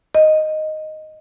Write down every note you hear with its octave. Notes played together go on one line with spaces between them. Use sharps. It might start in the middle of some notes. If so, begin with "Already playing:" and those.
D#5